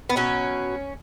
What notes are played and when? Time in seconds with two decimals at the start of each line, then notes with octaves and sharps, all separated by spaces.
0.10 B3
0.16 B2 F#3 C#4